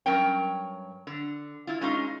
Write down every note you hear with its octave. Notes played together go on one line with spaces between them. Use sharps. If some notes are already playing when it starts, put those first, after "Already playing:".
G2 F#3 C#4 A#4 C#5 G5
D3
E4 F4
G#3 C#4 D#4 F4